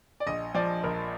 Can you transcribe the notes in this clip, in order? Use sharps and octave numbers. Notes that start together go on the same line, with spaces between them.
D5
A#1 D#5
F3 D5
A#1 A#4